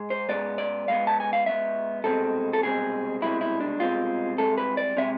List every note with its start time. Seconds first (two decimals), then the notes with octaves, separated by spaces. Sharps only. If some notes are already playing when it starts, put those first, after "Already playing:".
Already playing: G#2 G#3
0.10 C5
0.29 G#2 G#3 B3 D5
0.58 D5
0.88 G#2 G#3 B3 F5
1.07 A5
1.20 G#5
1.33 F5
1.45 G#2 G#3 B3 E5
2.04 C2 B2 G#3 C4 A4
2.53 A4
2.62 C2 B2 G#3 C4 G#4
3.21 C2 B2 G#3 C4 E4
3.41 E4
3.60 D4
3.79 C2 B2 G#3 C4 F4
4.38 C2 C3 G#3 A4
4.58 B4
4.77 D5
4.97 C3 G#3 E5